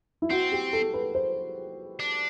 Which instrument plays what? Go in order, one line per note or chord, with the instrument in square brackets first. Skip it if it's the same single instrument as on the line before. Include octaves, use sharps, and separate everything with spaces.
[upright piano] E4
[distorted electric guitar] C4 [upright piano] F#4
[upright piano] G4
A4
B4
C5
[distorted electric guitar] D4